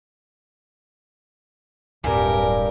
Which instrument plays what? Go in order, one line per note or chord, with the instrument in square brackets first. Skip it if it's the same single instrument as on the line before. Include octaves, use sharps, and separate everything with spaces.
[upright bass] D1 [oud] G2 [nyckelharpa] G4 A#4 [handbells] G#5